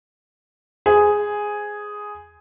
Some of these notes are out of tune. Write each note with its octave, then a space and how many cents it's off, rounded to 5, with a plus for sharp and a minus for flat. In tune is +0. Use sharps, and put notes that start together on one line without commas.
G#4 +0 C5 -25